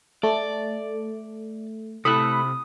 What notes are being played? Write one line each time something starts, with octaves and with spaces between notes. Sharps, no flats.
A3 D5
C3 A3 E4 A4 B5 D#6 E6 F#6